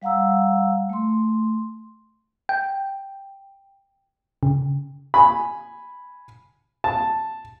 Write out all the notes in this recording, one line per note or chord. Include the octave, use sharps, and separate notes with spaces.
G3 F5 F#5 A#5 E6
A3 C6
G5
C#3
G#5 B5
A5